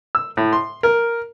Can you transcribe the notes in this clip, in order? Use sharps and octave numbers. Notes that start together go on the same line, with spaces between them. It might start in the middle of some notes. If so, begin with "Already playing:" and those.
E6
A2
C6
A#4